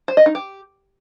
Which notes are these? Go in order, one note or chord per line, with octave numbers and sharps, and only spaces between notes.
C5
D#5
D#4
G4